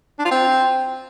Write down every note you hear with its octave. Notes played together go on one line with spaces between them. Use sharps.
D4
F4
C4